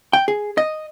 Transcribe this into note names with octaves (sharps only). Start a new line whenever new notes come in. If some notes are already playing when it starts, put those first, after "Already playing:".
G5
G#4
D#5